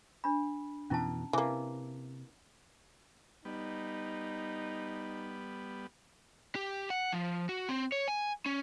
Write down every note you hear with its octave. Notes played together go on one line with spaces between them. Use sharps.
D4 B5
F2 B2 E3 C#4 E4 A5
C3 E3 A#3
G3 B3 D#4
G4
F#5
F3
F#4
C4
C#5
G#5
C#4